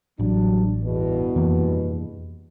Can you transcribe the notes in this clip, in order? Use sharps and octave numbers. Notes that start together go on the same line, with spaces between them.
A1 F#3 G3 D4
E2 G2 B2
F2 E3 A#3